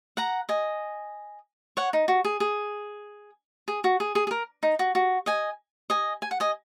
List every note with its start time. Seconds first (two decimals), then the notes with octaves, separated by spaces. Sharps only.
0.17 F#5 A#5
0.49 D#5 G#5
1.77 C#5 F#5
1.93 D#4
2.08 F#4
2.25 G#4
2.40 G#4
3.68 G#4
3.84 F#4
4.00 G#4
4.15 G#4
4.27 G#4
4.31 A#4
4.63 D#4
4.79 F#4
4.95 F#4
5.26 D#5 G#5
5.90 D#5 G#5
6.22 G#5
6.31 F#5
6.40 D#5 G#5